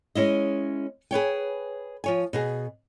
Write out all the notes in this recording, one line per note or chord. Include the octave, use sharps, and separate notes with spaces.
G#3 C#4 E4 D#5
G#4 B4 C#5 G5
F3 C#5 G#5
B2 F#4 G#4